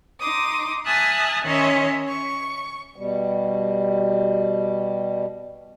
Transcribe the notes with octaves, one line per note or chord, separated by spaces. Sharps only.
D#4 C6 D6 D#6
E5 G#5 A5 D#6 F6 F#6
D#3 C#4 C#5 D#5 E5 C6
C#6
B2 G3